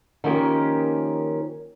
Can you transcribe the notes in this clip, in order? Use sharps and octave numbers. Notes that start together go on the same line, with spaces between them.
D#3 F3 A#3 C#4 G4